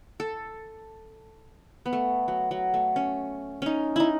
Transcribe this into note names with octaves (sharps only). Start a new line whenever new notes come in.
A4
B3
A3
F#3
F#3
A3
C#4
C#4 D#4
D#4 E4